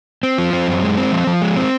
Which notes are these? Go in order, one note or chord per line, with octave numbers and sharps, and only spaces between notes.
C4
F3
C4
F#2
G#3
C4
F3
F3
G#3
C4